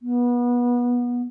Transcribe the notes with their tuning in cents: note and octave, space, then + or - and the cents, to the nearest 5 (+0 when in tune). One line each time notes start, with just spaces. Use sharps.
B3 -25